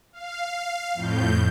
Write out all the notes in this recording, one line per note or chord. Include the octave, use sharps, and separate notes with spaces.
F5
F2 A2 G6